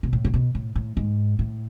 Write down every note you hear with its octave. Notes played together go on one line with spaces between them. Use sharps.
B2
A2
C#3
B2
A2
A2
G#2
A2